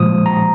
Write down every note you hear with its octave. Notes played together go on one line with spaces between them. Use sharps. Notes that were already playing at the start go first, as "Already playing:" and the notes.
Already playing: A#2 F3 G#3 D#6
A#5